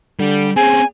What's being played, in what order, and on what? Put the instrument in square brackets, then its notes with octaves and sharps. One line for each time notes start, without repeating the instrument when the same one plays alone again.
[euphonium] D3 [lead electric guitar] G3
[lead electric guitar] C4 C#4 [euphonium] G#4 [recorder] G#5